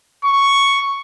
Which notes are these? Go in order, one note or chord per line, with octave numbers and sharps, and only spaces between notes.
C#6